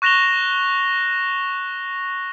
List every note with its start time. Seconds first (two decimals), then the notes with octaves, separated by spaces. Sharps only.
0.02 C#6 F#6 A#6 E7 F7 G7